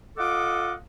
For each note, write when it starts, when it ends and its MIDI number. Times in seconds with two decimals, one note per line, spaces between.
0.17 0.72 65
0.17 0.72 69
0.17 0.72 75
0.17 0.72 78
0.17 0.72 86